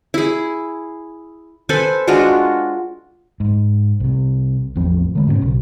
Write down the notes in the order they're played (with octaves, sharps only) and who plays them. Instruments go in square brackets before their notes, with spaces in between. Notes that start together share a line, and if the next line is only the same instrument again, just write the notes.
[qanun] E4 G#4
A4 B4 C5 G#5
G#3 D4 F4 F#4
[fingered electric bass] G#2
C2 C3
A1 E2 F3 C4
D3 G#3 A3
G#2 C#3 B3 C#4
B1